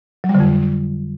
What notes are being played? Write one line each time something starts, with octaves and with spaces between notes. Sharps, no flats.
F#3
G3
D3
F2